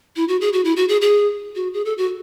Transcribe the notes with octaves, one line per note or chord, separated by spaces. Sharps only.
E4
F#4
G#4
F#4
E4
F#4
G#4
G#4
F#4
G#4
A4
F#4